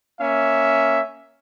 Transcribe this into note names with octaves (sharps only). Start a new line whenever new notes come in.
A#3 C#4 E5